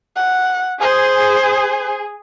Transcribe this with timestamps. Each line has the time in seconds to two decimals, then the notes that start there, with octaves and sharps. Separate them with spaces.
0.16 F#5
0.81 G#4 C5